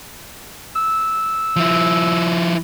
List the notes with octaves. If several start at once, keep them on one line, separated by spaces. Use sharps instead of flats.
E6
F3 E4